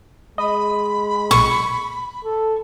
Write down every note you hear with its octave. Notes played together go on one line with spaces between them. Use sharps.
G#3 D#5 B5
B1 A#2 C#6
A4